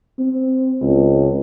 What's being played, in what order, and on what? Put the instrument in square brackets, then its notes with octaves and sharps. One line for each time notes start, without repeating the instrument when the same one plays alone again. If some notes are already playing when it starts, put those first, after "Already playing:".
[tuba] C4
C#2